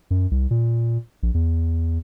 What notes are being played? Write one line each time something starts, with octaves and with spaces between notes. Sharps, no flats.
F#2
C2
A#2
A#1
E2